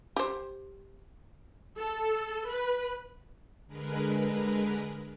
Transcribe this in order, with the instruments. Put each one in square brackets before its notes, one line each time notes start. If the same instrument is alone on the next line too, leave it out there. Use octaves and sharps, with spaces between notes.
[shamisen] G4 C5
[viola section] A4
B4
[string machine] D3 G#3 A#4 B4